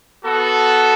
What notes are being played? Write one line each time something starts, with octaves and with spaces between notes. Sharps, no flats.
B3 F#4 A4